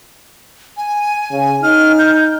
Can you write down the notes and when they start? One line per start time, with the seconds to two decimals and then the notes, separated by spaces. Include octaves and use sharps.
0.77 G#5
1.32 C#3
1.63 D#4 F6
1.99 G6